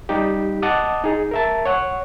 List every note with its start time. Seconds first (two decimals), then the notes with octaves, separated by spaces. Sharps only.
0.09 G3 D#4 G4
0.62 D#5 F#5 A5 D6 D#6
1.04 D#4 G#4
1.31 A#4 E5 A5
1.65 C#5 F#5